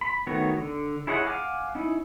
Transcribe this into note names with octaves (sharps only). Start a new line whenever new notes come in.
B5
D#3 A3 B3 F#4 C#5
D3
E4 G#4 C#5 D#5 F#5
F5 F#5 G#5 D6 F6
C#4 D#4 E4